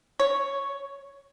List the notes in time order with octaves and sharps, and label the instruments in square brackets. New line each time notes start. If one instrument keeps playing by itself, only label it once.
[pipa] C#5